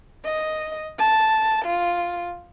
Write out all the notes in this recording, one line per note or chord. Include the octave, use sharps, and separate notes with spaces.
D#5
A5
F4